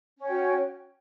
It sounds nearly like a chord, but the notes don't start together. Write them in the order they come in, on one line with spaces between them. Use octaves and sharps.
C#4 C#5 G5 F#4